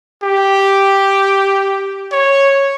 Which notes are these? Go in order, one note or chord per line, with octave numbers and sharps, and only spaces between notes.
G4
C#5